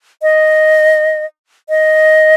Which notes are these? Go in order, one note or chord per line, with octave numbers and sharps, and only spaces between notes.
D#5
D#5